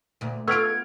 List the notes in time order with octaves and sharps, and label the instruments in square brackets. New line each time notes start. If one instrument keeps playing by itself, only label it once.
[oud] D2 A#2
[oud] B3 F4 [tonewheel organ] A4 [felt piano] C#6 F6 D7 [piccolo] G#6